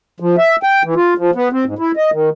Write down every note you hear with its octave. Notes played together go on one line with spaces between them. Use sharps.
F3
E5
G5
E3
F4
F3
B3
C4
G#2
E4
D#5
D#3